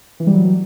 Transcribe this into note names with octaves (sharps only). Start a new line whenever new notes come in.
E3
G3
F#3